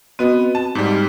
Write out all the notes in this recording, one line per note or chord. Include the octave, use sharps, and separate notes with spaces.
B3 C4 F#4 D#5 D#7
A5
G#2 G3
F6